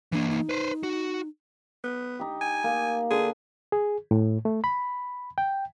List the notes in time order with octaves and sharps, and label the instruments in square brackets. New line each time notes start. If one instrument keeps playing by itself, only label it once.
[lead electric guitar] E3 A#3 [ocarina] D4
[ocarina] D#4
[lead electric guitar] B4 C5
F#4
[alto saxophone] B3
[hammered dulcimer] D#4 G4
[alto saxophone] G#5
[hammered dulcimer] A#3
[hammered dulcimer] D3 [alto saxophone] G#4
[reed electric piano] G#4
A2
A3
B5
G5